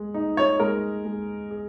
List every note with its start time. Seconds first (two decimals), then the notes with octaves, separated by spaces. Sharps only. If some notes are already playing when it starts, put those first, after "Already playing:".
Already playing: G#3
0.14 D#4
0.37 C#5
0.60 G#3 A#4
1.05 G#3
1.51 G#4